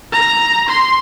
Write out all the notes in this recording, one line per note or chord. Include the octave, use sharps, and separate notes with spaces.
A#5
C6